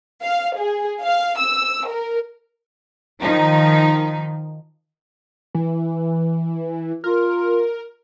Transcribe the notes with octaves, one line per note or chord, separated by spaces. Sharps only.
F5
G#4
F5
E6
A#4
D#3 F3 D#4
E3
F4 A#4